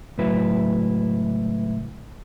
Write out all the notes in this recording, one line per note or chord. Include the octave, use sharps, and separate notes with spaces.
C#2 A2 F#3 E4 B4